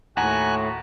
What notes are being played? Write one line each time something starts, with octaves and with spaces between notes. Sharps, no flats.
D#2 A2 F#4 F#5 G#5 A#5 F#6